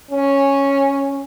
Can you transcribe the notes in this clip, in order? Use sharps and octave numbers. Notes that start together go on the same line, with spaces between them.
C#4